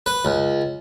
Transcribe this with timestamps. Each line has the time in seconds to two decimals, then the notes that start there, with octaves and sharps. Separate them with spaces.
0.06 B4
0.25 C#2